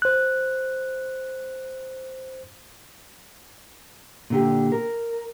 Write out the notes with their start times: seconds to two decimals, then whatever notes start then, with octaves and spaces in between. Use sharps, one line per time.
0.02 C5 F#6
4.30 A#2 D3 G4
4.72 A#4